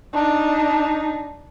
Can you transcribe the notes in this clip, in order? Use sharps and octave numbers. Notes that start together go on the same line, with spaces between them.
D4 D#4